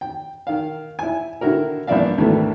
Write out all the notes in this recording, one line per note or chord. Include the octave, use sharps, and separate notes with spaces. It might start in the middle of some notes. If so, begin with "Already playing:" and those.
G5
D#3 F5
E4 G#5
D3 D#3 E4 F#4 A#4
A#1 G2 E3 D5 E5 F5
D2 G#2 B2 D#3 E3 A3